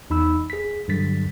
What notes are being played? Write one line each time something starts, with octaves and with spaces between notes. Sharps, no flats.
E2 D#4 B5 E6
G#4 B6
G2 D3 F#3 A6 B6